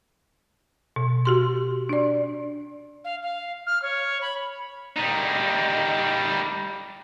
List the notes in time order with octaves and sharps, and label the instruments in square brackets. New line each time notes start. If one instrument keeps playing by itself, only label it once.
[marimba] B2
F#4 G4 C6
D4 D5
[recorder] F5
F5
F6
C#5
B5
[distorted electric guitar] G3 D#4